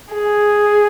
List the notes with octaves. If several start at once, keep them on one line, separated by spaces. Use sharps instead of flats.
G#4